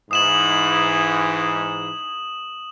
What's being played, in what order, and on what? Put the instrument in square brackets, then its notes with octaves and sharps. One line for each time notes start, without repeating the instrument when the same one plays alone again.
[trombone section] G#2 E3 [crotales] D#6 E7 F#7